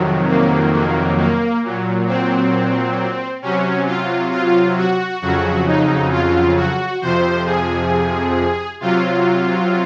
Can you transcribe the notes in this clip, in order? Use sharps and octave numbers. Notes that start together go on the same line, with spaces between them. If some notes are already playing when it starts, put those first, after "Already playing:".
Already playing: F2 C3 D#3 F#3
A#3
A#3
A#3
A#2 F#3
C4
C3 F#3 C#4
F4
F4
F#4
F2 C#3 F#3 F#4
D#4
F4
F#4
F2 C3 F3 C5
G#4
C3 F#3 F4